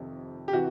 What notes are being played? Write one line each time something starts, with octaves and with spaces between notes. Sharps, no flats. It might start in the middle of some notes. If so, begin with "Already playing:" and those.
Already playing: F1 F2 C3 D#3
G4
C3 E3 F#4